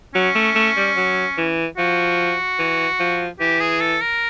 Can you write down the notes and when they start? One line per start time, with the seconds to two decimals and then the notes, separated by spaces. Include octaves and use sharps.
0.14 F#3 C#4
0.35 A3
0.55 A3
0.77 G3
0.96 F#3
1.38 E3
1.77 F3 F#4
2.59 E3
3.00 F3
3.40 E3 G4
3.61 G#4
3.81 A4
4.01 A#4